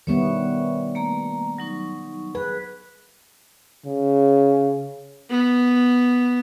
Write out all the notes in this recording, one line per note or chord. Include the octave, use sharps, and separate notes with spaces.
D#3 G3 B3 C#5 E5 C#6
A3 A#3 A#5
F#3 D#4 C#6
G#4 B4
C#3
B3